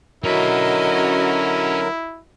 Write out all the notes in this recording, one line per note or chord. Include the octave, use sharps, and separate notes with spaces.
D3 F#3 C#4 E4 F#4 A#4 D#5 B5